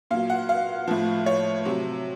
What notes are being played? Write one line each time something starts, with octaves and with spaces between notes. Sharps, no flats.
A#2 F#3 F5
F#5
F5
A2 F3
C#5
C3 F#3